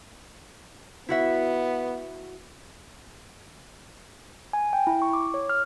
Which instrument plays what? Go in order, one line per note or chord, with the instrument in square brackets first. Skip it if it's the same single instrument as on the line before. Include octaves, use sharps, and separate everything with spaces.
[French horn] B3 [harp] E4 F#4 E5
[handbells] G#5
G5
E4
C#6
D6
C#5
F6